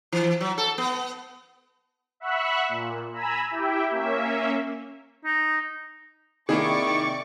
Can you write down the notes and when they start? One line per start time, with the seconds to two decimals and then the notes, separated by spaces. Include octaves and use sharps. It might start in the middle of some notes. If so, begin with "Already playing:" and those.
0.12 E3
0.41 F#3
0.58 A4
0.78 B3
2.20 E5 F#5 B5 C#6 E6 F#6
2.69 A#2
3.13 G#5 A#5 B5 E6
3.51 E4 G4 E5 G5
3.91 A#3 C#4 E5
5.25 D#4
6.49 C3 D#3 A#3 E4 G#4 D5 C#6 D6